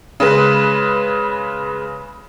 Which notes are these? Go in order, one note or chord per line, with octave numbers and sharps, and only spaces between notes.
C#3 G#3 B4